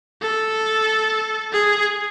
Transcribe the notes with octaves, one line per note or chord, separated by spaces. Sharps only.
A4
G#4